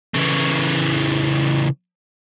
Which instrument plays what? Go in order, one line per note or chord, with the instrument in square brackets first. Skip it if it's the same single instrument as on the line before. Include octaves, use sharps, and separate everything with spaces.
[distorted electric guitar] C#3 E3